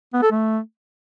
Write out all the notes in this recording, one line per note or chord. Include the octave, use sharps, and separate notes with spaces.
B3
A4
A3